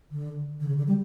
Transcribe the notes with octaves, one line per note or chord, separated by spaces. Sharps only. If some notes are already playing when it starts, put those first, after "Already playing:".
D3
D3
C#3
D3
G3